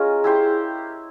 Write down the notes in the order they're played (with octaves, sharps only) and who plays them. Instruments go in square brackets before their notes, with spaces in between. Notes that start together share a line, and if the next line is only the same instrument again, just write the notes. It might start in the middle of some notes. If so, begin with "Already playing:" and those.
Already playing: [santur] C#4 F4 A#4 D#5 [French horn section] G#4
[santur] E4 G4 C5